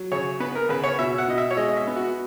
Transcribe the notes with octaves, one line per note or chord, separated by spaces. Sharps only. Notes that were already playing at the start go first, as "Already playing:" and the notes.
Already playing: F#3
C#3 C#5
B3 B4
A#4
C#3 B4
C#5
B2 E5
F#5
B2 D#5
E5
C#5
G#3 D#5
D#5
E5
B3
F#4